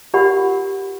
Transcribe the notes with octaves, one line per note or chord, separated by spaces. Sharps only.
F4 G4 A#4 D5 F#5 B5